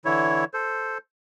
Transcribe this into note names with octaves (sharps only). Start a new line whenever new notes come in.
D3 E3 E4 C#5
A4 C5